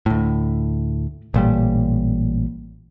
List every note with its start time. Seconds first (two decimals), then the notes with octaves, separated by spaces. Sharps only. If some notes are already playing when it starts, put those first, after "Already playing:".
0.06 D2 A2
1.34 A1 A#2 G3